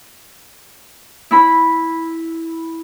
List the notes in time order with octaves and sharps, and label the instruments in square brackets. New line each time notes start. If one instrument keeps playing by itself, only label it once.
[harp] E4 B5